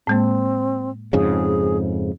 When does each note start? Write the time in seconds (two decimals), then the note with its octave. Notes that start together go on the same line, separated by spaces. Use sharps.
0.07 A2 G#3 A#3 C4
1.13 F2 G#2 C#3 G#4